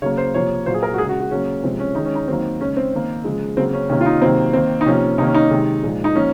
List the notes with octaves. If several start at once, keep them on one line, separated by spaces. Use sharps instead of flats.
C#3 F#3 A#3 C#5
C5
C3 F3 A#3 C#5
A#2 F#3 A#3 C5
G#4
A#4
F#4
C#3 G#3 G#4
F#4
F#4
C#3 F#3 A#3 C#4
C3 F3 G#3 C4
C#4
D#3 G#3 D#4
C#4
D#4
D#3 F#3 A#3 C4
C#3 G#3 C#4
C4
D#3 A#3
C#3 F3 G#3
C#3 F#3 A#3 C4
C#4
C3 D#3 A#3 C#4
F4
D#4
C3 D#3 F#3 A#3 C4
D#3 A#3 C4
D#4
C3 F3 A#3 C#4
C3 D#3 A#3 D#4
C#4
D#4
C3 D#3 G#3
A#2 F3 G#3
D#4
F3 A#3 C#4